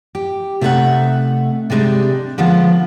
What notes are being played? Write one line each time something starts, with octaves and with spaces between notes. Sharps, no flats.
G4
C3 A3 D#4 A#4 E5 F#5
C3 G3 G#3 D4 D#4
D3 F3 G#3 A#3 B3